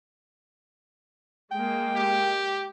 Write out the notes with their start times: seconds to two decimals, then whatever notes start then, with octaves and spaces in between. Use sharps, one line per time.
1.51 G#3 A#3 G5
1.96 G4